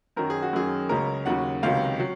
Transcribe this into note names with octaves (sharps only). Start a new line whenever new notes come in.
F#2 D#3 F#3 A#4
G#4
F#4
F#2 D#3 F#3 G#4
C#2 C#3 F#3 A#4
D#2 C#3 F#3 F#5
C#2 C3 D#3 F#3 F5
F#3